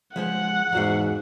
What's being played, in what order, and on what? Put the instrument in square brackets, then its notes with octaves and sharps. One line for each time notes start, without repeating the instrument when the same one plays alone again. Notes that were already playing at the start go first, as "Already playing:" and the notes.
[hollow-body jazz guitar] F3 G#3 C5 [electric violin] F#5
[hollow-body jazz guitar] E2 F#4 F5 [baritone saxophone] G#2